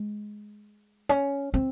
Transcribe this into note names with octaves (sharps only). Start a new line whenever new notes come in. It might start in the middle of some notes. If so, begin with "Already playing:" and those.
Already playing: G#3
C#4
C4